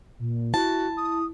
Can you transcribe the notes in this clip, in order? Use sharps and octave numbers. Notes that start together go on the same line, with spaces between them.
A#2
E4 F#4 A5
D#6